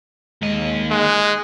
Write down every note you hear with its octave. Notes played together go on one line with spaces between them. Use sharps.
D#2 G#3 D#5
G#3 F#6